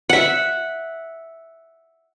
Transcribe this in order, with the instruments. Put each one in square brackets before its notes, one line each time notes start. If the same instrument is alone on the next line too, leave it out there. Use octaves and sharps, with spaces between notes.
[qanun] E5 F#5